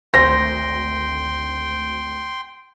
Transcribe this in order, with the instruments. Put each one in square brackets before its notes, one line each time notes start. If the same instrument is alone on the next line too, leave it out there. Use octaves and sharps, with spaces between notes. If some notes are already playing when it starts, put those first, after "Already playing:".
[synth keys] G#1 D2 [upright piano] C5 [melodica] G5 C6 [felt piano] A#6